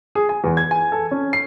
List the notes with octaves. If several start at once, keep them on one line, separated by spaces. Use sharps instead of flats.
G#4
G#5
E2
G#6
G#5
A4
C#4
C7